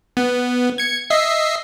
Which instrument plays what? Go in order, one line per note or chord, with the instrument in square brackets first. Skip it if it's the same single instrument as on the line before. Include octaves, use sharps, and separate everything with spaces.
[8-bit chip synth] B3
G#6 C#7
D#5 E5 C7